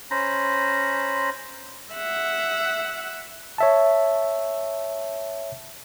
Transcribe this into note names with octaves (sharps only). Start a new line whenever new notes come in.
C#4 C5 A#5 B5
E5 F#5
C#5 E5 A5